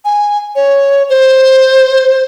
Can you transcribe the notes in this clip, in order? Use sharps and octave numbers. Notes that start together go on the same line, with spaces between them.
G#5
C#5
C5